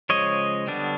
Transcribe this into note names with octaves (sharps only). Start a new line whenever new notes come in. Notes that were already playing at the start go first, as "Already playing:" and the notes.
C#3 F3 G#3 C#5 D#5
D3 G3 B3 D4